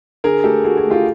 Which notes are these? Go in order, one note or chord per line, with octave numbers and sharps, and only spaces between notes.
D3 G#4 A#4
A3 G4 A4
A3 F#4 G#4
F#4 G#4
A3
F4 G4